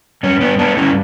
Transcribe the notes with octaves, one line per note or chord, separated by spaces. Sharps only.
G2 C#4
G2 B3 D4
A3 B3 D4
G2 C#4 E4